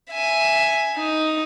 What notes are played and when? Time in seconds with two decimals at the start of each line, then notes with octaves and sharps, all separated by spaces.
0.12 E5 G#5
0.98 D#4